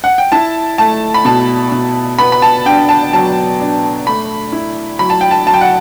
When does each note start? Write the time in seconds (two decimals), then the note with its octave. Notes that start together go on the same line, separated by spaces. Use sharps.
0.04 F#5
0.18 G5
0.32 E4 A5
0.78 A3 A5
1.14 B5
1.25 B2 A5
1.72 B2
2.18 B3 B5
2.32 B5
2.42 A5
2.65 D4 G5
2.89 A5
3.13 F#3 A5
3.60 D4
4.07 A3 B5
4.52 E4
4.99 F#3 B5
5.10 A5
5.21 G5
5.31 A5
5.47 F#3 A5
5.54 G5
5.61 F#5